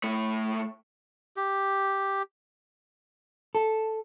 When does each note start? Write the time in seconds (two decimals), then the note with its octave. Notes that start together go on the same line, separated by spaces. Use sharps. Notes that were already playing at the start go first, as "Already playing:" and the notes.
0.04 A2 A3
1.37 G4
3.55 A4